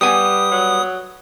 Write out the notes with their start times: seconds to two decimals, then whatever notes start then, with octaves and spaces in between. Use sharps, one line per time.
0.01 G3 B3 G4 G#5 D#6
0.51 F#3